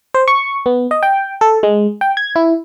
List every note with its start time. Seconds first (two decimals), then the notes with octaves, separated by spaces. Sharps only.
0.14 C5
0.28 C#6
0.66 B3
0.91 D#5
1.03 G5
1.41 A4
1.63 G#3
2.01 G5
2.17 G#6
2.36 E4